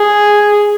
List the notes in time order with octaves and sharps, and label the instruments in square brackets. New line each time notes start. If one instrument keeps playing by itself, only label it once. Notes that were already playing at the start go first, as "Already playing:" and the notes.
Already playing: [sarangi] G#4